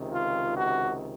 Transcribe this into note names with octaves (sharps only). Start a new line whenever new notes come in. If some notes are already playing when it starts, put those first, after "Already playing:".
Already playing: C#2 C3 D#3
F4
F#4